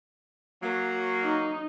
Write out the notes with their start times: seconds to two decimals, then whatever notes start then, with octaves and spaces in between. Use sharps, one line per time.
0.62 F#3 A#3
1.24 D#4